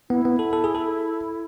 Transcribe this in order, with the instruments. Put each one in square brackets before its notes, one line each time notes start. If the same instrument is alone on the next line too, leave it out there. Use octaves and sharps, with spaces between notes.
[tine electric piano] B3 [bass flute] E4
[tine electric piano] B3
A4
A4
G#4
A4